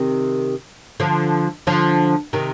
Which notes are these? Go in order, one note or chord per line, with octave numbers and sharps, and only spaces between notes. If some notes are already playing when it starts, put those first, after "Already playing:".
Already playing: C3 D#3
D3 F3
D3 F3
C3 D#3